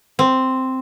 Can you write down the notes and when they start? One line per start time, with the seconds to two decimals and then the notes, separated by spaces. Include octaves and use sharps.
0.19 C4